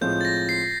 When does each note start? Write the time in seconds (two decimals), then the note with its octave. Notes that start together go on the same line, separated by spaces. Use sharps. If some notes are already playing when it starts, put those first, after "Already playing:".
0.01 A2 F3 G#3 C4 F4 G6
0.21 A6
0.25 A#6
0.49 C7